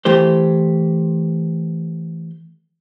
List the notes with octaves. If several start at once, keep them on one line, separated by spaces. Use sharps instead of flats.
E3 A3 G4 C5